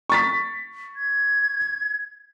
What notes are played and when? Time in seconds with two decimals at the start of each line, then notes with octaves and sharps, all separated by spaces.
0.10 C#6 A6 B6
0.96 G#6